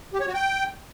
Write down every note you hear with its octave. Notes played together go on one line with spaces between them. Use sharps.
G4
C#5
F#4
G5